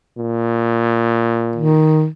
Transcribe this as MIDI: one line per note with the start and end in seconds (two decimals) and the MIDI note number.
0.18 1.86 46
1.56 2.07 51